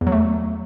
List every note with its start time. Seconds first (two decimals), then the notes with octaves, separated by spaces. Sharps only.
0.01 E2
0.07 F#3
0.12 A3